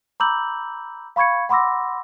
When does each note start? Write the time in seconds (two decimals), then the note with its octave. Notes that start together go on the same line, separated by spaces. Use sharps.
0.20 A#5 B5 D6 E6 G6 F#7
1.16 F5 B5 C#6 G#6 C#7
1.49 F#5 B5 C6 D6 E6 A#6